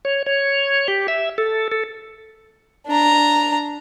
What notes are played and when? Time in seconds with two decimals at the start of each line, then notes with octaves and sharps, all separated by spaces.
0.05 C#5
0.26 C#5
0.88 G4
1.08 E5
1.38 A4
1.72 A4
2.87 D4 A#5